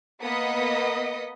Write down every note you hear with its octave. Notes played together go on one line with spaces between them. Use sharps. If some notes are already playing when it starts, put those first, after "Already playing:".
A#3 B3 D#5 D#6 B6 C#7